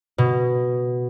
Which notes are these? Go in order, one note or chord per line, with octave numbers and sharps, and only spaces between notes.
B2